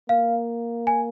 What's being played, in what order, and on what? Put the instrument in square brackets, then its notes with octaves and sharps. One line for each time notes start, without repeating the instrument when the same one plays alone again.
[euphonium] A#3 [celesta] F5
[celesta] G#5